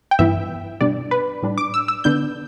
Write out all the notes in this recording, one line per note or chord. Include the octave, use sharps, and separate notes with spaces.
G5
G2 E3 B3 E4 E5
B2 G3 D4 D5
B4
A2 G3 D4
D6
E6
E6
D3 B3 D4 G6